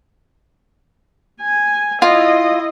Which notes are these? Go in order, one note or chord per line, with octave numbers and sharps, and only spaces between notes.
G#5
E4 F4 D#5